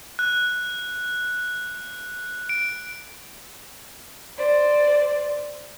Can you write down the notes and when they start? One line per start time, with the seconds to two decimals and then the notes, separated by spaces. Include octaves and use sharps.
0.19 F#6
2.49 D7
4.37 C5 D5